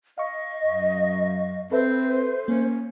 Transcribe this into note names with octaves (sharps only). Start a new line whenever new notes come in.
D#5 F5 C#6
F#2
C4 A4 B4 C5 E5
A#3 C#4